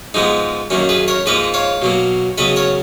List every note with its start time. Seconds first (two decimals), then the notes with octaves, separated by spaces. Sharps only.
0.14 G#2 F3 G#3 B3 D#4
0.70 F#2 D#3 A#3 C#4
0.89 G#4 B4
1.08 A#4 C#5
1.26 G#2 F3 A#3 B4 D#5
1.54 C#5 F5
1.82 B2 F#3 A#3
2.38 C#3 F#3 B3 B4 D#5
2.56 A#4 C#5